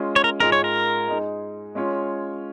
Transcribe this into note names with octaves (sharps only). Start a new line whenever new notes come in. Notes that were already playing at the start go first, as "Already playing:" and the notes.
Already playing: G#3 C#4 F4
C#5
A#4
G#2 G#3 F4 G#4 A#4 D#5
C#5
A#4
G#3 D#4 G#4
G#3 C#4 F4 C#5